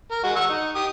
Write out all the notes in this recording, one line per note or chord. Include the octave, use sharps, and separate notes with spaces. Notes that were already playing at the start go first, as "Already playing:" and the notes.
A#4
G#3 F#4
F#5 C#6 E6
D#4
G4 D#6